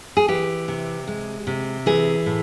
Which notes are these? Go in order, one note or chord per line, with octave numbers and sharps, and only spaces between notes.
G#4
E3 G4
C3
G#3
C3
E3 G#4
A2